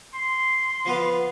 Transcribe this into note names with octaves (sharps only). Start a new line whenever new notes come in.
C6
F3 B3 F5